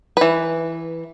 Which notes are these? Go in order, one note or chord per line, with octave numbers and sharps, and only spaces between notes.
E3 B4